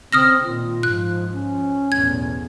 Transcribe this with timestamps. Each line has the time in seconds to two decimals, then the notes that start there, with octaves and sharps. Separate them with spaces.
0.13 C#3 C4 D#6 F6 A#6
0.44 A#2 D#3 F4
0.83 G#2 F3 F#6
1.32 C#4
1.92 B1 E2 A2 G#6